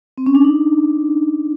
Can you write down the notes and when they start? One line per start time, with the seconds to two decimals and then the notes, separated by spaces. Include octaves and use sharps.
0.18 C4
0.26 C#4
0.35 D4
0.44 D#4